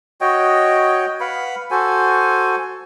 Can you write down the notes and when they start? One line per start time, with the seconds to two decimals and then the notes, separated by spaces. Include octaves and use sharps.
0.21 F#4 C#5 D#5 G5
1.20 B4 F5 F#5 B5
1.71 F#4 A4 C5 G#5